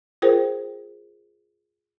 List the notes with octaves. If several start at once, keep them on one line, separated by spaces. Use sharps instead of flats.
F4 G#4 A#4 C5 G5